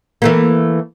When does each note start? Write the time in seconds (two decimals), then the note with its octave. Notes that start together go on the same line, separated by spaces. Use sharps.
0.22 E3 A3 A#3